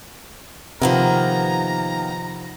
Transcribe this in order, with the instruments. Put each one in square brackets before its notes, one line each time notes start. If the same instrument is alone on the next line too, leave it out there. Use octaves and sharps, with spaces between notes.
[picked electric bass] C3 F3 [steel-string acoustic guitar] D#3 A#3 B3 [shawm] A#5